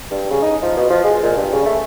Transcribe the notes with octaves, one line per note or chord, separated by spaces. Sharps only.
G2
C#3
D#4
F3
B2
F3
G#3
A#2
G2
C#3
A3